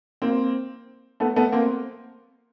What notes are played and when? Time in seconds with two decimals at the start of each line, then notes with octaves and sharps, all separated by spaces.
0.22 A#3 C4
1.20 A3 B3
1.36 A3 B3
1.52 A#3 C4